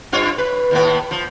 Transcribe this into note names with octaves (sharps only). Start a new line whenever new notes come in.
G2 F4 C#5
B4
D#2 A2 B3
F3